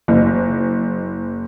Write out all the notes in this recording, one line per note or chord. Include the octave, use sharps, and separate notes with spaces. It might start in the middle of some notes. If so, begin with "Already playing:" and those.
F#1